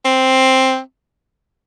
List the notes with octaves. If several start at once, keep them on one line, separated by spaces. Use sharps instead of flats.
C4